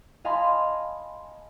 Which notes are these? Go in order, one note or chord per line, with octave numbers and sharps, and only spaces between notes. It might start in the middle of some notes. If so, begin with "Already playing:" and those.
D#5 F5 G#5 A5 B5 C6